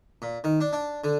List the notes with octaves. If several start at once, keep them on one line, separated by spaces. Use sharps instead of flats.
A#2
D#3
D4
D4
D3